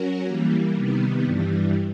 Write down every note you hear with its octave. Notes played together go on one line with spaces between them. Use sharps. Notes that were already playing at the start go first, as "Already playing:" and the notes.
Already playing: F#3 C#4 F#4 A#4
E3 G3 A#3
C3 D#3 G3 B3
G2 E3 G3